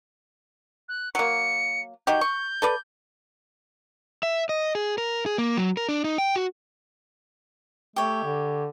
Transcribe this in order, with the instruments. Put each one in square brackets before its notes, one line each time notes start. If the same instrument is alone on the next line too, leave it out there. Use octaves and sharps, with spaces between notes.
[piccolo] F#6
[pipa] F#3 A#3 [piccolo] C#7
[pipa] D#4 F#4 G4 [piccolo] G6
[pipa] C#6
A4 B4 D5
[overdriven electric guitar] E5
D#5
G#4
A#4
G#4
A#3
F#3
A#4
D4
D#4
G5
F#4
[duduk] A3 [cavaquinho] G4 C#5
[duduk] D3